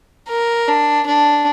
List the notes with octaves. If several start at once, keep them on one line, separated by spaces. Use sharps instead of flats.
A#4
D4
D4